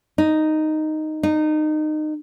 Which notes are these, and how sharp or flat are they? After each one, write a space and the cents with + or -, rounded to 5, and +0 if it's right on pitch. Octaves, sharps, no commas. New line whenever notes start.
D#4 -5
D#4 -25